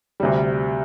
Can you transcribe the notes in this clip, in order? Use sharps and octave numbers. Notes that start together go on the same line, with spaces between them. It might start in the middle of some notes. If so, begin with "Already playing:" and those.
D2 C3 G3